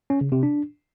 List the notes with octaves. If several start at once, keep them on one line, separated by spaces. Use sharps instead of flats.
C#4
C#3
C3
D4